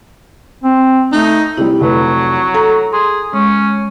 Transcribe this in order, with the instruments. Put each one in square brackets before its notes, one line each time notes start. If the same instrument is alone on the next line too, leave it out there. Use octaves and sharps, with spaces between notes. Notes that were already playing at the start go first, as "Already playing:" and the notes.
[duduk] C4
[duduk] A3 [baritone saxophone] D#4
[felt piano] C3 G3 [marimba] E4
[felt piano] F1 A3 B4 [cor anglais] F#3
[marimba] A4 [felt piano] A#5
[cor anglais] G#4 [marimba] C6
[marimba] G#3 [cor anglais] C#4